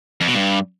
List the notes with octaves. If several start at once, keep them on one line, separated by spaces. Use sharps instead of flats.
F2
B2
G2